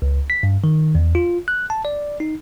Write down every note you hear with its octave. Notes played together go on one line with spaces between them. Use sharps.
C#2
B6
G2
D#3
E2
F4
F#6
A5
D5
D#4